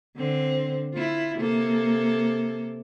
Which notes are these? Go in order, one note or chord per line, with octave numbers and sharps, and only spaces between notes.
D3 C4
E4 F4
C3 A#3 A4